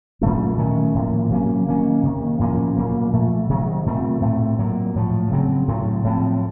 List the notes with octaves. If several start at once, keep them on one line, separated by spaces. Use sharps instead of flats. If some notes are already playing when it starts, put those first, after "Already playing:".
A#2 F#3 A3 C#4
D#3 A3 C#4
A2 F3 A#3
C3 F#3 A#3 C#4
D#3 A#3 C#4
C3 D#3 A#3
A2 F3 A#3 C#4
A#2 F#3 A#3
A#2 F3 A3
C3 D#3 F#3
A#2 A3 C4
A2 A3 C4
A#2 F#3 A#3
A2 F3 A3
C#3 F#3 C4
A2 F#3 A3
A2 F3 C4